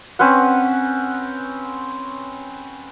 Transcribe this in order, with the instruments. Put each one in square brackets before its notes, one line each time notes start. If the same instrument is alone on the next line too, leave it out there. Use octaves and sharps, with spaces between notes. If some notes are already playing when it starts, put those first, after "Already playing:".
[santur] C4 C#4 B4 F#5